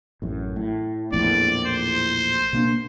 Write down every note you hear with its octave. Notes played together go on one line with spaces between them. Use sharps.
A1 F#2
A2
A#1 E2 A2 D5
C5
B2 A#3 D4